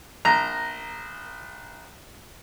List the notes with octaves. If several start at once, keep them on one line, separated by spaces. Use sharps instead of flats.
A#1 A#5